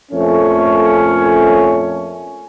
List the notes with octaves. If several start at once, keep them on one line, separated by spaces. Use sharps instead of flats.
F2 A#2 A3 C#4